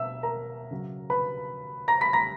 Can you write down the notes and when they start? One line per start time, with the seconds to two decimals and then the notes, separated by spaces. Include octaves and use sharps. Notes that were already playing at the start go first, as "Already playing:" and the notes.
Already playing: B2 E5 E6
0.23 A#4 A#5
0.71 C#3 F#3
1.10 B4 B5
1.88 A#5 A#6
2.01 B5 B6
2.13 A#5 A#6